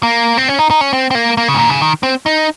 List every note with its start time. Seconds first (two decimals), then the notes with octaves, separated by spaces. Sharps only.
0.03 A#3
0.38 C4
0.48 C#4
0.59 D#4
0.70 D#4
0.81 C#4
0.93 C4
1.11 C4
1.15 A#3
1.37 A#3
1.48 C#3
1.54 G#2
1.58 A#2
1.70 C#3
1.82 D#3
2.03 C4
2.26 D#4